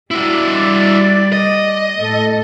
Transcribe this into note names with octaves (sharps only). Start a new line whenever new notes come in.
G3 E4 F#4 D5
D#5
A2 A4